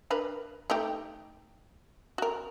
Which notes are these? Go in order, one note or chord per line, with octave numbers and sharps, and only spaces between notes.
D4 A#4 B4
A3 D#4 G4
F#4 A#4